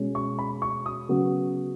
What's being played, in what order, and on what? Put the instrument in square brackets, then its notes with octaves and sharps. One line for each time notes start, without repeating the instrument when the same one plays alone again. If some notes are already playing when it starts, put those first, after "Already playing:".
Already playing: [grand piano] B2 G#3 C#4
C#6
B5
C#6
D#6
C#3 F#3 B3